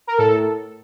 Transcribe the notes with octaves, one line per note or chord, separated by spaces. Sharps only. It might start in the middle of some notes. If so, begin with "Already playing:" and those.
A#4
A2 A4